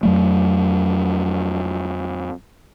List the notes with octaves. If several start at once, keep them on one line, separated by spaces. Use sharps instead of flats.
F2 F#3 A3